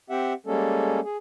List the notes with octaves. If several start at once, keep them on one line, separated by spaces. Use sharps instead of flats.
C4 G4 E5 F#5
G3 G#3 A#3 C#4 A4
G#4